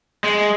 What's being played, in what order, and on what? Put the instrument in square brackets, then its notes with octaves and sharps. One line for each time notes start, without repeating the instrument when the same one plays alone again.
[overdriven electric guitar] G#3